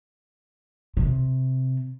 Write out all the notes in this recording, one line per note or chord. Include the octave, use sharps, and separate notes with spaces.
C3